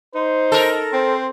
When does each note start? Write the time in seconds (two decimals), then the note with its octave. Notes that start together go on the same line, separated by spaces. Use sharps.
0.15 D#4 C5
0.52 A4 A#4
0.93 C4 C5